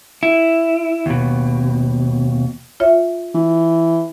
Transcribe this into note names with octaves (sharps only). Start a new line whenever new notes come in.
E4
D#2 B2
F4 C#5 E5
E3